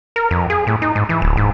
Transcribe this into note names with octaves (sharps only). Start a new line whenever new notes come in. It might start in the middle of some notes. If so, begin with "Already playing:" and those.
A#4
F2
G#4
A2
D#4
G#2
E3
D1
G#2